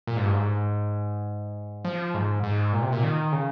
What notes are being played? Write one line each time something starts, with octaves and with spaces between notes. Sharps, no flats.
A#2
G#2
G2
G#2
F3
G#2
G#2
A#2
C3
A#2
D#3
C#3